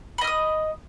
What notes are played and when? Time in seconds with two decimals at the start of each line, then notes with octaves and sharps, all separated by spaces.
0.18 B5
0.21 D#5
0.24 F6
0.27 D#6